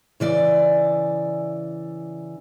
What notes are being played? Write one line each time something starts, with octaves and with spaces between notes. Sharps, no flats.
C#3 E3 D5